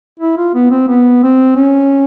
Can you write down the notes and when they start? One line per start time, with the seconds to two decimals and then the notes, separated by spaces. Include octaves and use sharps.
0.19 E4
0.37 F4
0.55 B3
0.71 C4
0.88 B3
1.23 C4
1.56 C#4